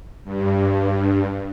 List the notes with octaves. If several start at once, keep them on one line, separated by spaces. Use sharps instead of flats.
G2